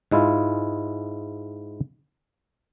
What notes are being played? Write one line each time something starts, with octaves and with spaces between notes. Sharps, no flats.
G#2 G#3 E4 F4